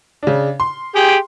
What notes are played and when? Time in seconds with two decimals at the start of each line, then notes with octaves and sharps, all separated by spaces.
0.23 C#3 D4
0.60 C6
0.96 G4 G#4 G5